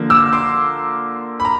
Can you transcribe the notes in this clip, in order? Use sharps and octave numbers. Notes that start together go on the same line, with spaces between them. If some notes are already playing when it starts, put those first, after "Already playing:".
Already playing: D3 F3 A#3
D6 E6
C6 D6
B5
A#5